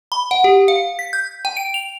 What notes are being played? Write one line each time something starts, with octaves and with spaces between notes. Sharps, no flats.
B5
F#5
G4
F5
B6
G6
G5
D7
F7